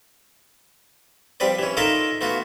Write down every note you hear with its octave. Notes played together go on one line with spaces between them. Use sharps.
F3 G3 C4 B4 D5
E3 C#4
D#4 F4 A4 A#4 E5 D6
A3 B3 F4 F#4